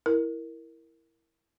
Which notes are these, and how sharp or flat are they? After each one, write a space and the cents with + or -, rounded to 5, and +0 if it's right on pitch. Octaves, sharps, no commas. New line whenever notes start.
E4 +0 A#4 +0